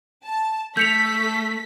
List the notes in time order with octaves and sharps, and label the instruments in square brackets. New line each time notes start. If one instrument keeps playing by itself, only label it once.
[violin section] A5
[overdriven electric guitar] A3 [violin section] A4 B6 [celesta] G6 C#7 F7